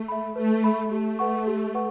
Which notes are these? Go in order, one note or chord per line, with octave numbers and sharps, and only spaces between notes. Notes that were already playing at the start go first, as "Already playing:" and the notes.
Already playing: A3
E5 B5
A3 B4
E5 B5
A3 G4
B4 F#5 C#6
G4
B4 F#5 C#6